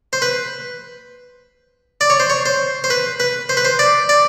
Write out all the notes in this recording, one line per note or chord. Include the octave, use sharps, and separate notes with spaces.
C5
B4
D5
C#5
C5
C#5
C5
C5
B4
B4
C5
B4
C5
D5
D5